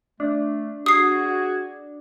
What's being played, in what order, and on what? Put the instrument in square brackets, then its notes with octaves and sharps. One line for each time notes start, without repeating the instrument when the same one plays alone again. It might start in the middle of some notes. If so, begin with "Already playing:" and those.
[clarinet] A3 [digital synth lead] D4
[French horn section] F#4 [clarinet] G#4 [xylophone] D#6 C7